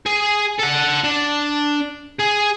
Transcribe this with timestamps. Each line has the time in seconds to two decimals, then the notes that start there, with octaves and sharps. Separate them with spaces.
0.06 G#4
0.59 A4 F#5
1.04 D4
2.20 G#4